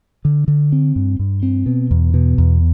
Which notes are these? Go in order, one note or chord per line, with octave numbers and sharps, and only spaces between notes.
D3
D3
C4
G2
G2
C4
B2
E2
B2
E2